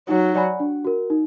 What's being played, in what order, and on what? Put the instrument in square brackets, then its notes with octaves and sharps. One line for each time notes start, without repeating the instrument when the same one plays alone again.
[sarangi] F#3 [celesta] D#4
[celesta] F#4 D5 G#5 B5
D4
F#4 A#4
D#4